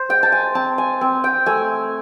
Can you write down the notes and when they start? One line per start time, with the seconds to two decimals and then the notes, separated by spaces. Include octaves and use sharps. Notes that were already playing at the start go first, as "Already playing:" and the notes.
Already playing: C5
0.09 G#3 G5
0.23 A5
0.32 G#5
0.55 C4 A5
0.78 G#5
1.01 C4
1.24 G5
1.46 A3 G#5